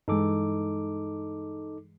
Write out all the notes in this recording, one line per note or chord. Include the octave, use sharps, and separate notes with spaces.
G2 E3 G#3 D#4 A4 D6